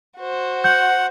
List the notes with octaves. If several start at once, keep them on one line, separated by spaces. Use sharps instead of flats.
F#4 C5
F#5 G6